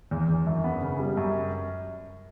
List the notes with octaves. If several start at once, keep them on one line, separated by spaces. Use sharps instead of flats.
E2
E2
F#2
B3
C#3
G3
F#2